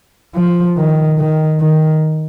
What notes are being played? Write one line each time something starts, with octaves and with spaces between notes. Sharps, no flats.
F3
D#3
D#3
D#3